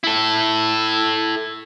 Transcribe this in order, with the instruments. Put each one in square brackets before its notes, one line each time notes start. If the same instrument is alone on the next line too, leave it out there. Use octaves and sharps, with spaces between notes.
[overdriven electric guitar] E4 A4